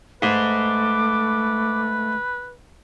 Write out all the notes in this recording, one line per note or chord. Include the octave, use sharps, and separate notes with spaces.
G#2 A3 B4 D6